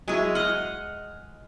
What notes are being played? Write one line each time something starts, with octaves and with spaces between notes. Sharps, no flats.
F#3 G#3 E4 G#4
D#5 F#5 F6